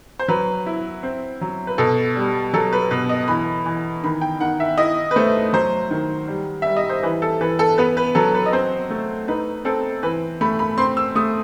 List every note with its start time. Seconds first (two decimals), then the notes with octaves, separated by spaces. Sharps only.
0.19 C5
0.28 F#3 B4
0.66 E4
1.03 C4
1.41 F#3
1.67 B4
1.78 B2 A4
2.16 G3
2.53 F#3 A4
2.73 B4
2.91 B2 B4
3.09 D#5
3.28 E3 B5
3.66 E3
4.04 D#3 B5
4.21 G5
4.40 D#3 F#5
4.60 E5
4.78 E4 D#5
5.11 B4
5.16 A3 C5
5.53 F#3 C5
5.91 D#3
6.27 G3
6.62 G3 E5
6.77 D#5
6.89 C5
7.03 E3 B4
7.22 A4
7.41 E3 B4
7.59 A4
7.78 B3 B4
7.97 B4
8.15 F#3 A4
8.34 B4
8.46 D#5
8.52 C4 C5
8.90 A3
9.28 D#4 B4
9.65 C4 A4
10.03 E3 B4
10.41 A3 B5
10.59 B5
10.78 C4 C6
10.97 E6
11.15 A3 D#6